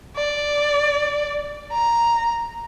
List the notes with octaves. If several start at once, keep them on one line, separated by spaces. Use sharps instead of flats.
D5
A#5